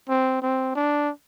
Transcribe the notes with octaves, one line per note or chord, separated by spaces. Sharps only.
C4
C4
D4